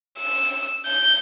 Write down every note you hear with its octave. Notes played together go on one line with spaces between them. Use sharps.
E6
G6